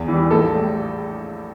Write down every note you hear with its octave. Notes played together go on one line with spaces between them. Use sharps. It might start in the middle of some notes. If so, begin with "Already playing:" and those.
Already playing: E2
E3 G3
A#1 A4
A2 G3